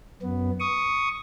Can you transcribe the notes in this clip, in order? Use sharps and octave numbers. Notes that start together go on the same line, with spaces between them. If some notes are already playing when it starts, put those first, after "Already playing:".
F#2 B3
C#6 D#6